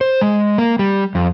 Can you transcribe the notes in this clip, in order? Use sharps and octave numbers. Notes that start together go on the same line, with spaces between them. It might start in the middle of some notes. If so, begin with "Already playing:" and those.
C5
G#3
A#3
G3
F2